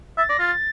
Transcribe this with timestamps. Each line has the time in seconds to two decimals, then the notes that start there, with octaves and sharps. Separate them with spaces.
0.17 E5 A6
0.29 D5 A#6
0.39 F4 A6